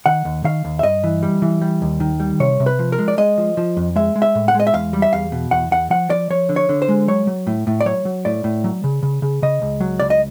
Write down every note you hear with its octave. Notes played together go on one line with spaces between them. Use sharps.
D#3 F#5
D#2
D#3 F5
D#2
E5
G2 D#5
E3
G3
E3
G3
D#2
D#3
G3
C3 C#5
C3
B4
F3
A#4
G#3
D5
G#3 D#5
F3
F3
F2
G#3 E5
G#3
E5
A2
F#5
G#3
D#5
E5
E2 F5
G3
E5
E2 F5
B2
E2 F#5
E2 F#5
F3 F#5
F3 D5
F3 C#5
D3
C#5
D3
C5
G#3
F#3 C#5
F#3
A2
A2
D5
F#3 C#5
F#3
A2 D5
A2
F#3
C#3
C#3
C#3
C#3 D#5
C#2
F#3
C#2 D5
D#5